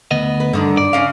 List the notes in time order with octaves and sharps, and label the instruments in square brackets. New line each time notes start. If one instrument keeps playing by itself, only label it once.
[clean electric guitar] D2 B3 D#5
[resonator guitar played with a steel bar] B4
[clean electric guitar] G2 [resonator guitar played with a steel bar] D3 D#3 D4
[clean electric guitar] D5
[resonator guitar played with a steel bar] C#3 C#4 F5